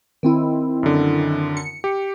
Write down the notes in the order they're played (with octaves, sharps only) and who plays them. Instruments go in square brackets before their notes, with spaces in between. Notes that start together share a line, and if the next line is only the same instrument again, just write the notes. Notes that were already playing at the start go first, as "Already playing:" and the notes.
[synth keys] D#3 C4 E4
[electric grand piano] F#2 D3
[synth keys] C#7
[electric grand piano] G4